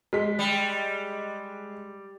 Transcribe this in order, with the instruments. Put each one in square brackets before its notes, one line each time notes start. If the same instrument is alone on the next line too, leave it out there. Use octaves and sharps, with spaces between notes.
[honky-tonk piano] G#3 B6
[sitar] G3